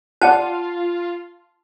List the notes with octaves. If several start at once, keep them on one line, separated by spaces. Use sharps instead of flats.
F4 D5 F#5 A5 F#6